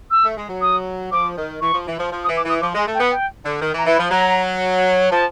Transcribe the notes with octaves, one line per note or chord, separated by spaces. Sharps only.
E6
A3
G#3
F#3
D#6
F3 D6
D#3
E3 C#6
F3
E3
F3
F3
D#6
E3
D6
E3 D#6
F3 D6
G#3 G#5
A3
G5
B3
G5
D3
D#3
E3
A#5
E3
B5
F3
F#3 A#5
F3 A5